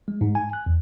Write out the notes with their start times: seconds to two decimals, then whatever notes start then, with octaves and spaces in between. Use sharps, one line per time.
0.08 G#3
0.21 G#2
0.35 G#5
0.53 F#6
0.66 E2